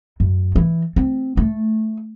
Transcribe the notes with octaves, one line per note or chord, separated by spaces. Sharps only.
F#2
E3
C4
A3